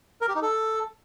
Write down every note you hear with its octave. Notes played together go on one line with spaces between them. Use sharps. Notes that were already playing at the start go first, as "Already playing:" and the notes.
A#4
G4
D#4
A4